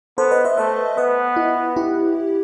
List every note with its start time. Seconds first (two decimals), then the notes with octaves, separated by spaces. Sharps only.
0.18 B3 A4 C5
0.31 B4 D#5
0.45 C5 E5
0.57 A3 C5 E5
0.97 B3 B4 D#5
1.36 E4
1.76 E4 G4